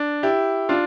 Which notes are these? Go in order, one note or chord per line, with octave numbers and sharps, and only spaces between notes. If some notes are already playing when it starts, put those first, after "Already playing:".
Already playing: D4
E4 G4
D4 F4